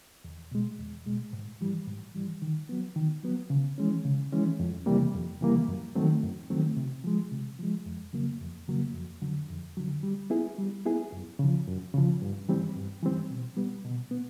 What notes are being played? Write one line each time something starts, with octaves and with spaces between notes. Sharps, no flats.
E2
B2 G#3
E2
B2 G#3
G#2
E3 G3
G#2
E3 G3
D#3
F#3 B3
D#3
F#3 B3
C#3
E3 G#3 C#4
C#3
E3 G#3 C#4
F2
C3 E3 G3 A#3
F2
C3 E3 G3 A#3
F#2
D#3 F#3 A3 C4
F#2
D#3 F#3 A3 C4
C3
F3 G#3
C3
F3 G#3
F2
C#3 F#3 A#3
F2
C#3 F#3 A#3
F2
D3 F#3
F2
D3 F#3
G3
B3 E4 G#4
G3
B3 E4 G#4
F#2
C#3 F3
F#2
C#3 F3
G2
E3 G3 C4
G2
E3 G3 C4
B2
G3 B3
B2
B3